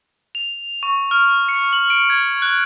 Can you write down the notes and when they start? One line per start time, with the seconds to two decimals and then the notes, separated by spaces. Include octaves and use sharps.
0.35 F7
0.83 C#6
1.11 F6
1.49 C#7
1.73 F#7
1.90 D7
2.10 G#6
2.42 F#6